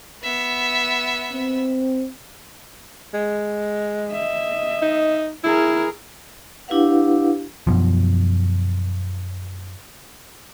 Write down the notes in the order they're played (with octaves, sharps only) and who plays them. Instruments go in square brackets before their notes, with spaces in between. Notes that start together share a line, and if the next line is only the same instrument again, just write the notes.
[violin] B3 E5
[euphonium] C4
[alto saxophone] G#3
[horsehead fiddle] D#5 E5
[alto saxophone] D#4
[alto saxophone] E4 [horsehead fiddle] G#4 A#4
[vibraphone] D4 E4 G4 B4 F5 F#5
[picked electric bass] F#2 B2 F3